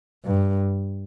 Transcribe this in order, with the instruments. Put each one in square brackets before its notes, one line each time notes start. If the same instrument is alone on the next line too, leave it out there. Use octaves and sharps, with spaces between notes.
[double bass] G2